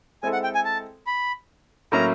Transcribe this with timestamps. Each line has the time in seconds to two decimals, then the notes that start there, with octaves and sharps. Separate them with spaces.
0.23 G#3 C4 E4 A4 G#5
0.33 F#5
0.44 G5
0.55 G#5
0.65 A5
1.07 B5
1.92 A2 F#3 A#3 C#4 E4 A#5